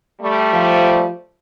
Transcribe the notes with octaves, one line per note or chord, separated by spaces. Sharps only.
G3 A3
F3